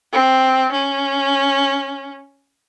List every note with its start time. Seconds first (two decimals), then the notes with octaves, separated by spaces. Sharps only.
0.13 C4
0.72 C#4